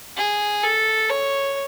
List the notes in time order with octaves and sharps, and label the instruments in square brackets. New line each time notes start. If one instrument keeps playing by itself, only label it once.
[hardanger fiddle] G#4
A4
C#5